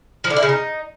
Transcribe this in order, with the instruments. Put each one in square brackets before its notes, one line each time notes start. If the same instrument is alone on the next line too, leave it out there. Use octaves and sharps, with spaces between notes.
[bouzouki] F3
D3
E4
C#3
D#4